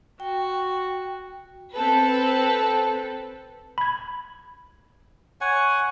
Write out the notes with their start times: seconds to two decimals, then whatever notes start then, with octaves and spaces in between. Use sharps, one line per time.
0.20 F#4 G5
1.74 C4 A4 B4
3.78 B5 G#6
5.41 C#5 F#5 G#5